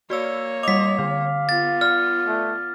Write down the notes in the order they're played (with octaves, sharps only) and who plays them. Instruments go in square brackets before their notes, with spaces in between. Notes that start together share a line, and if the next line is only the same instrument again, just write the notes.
[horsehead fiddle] A#3 C#5 [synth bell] F#4 D5 E6
[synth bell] G3 F7 [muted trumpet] D#5 [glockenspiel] D6 B6
[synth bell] D3 [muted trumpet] F5
[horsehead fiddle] B3 F4 [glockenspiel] A6
[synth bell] D5 [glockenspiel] F6
[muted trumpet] A3